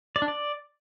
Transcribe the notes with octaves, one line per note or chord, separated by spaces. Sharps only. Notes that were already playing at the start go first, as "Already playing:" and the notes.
D5
D4
D5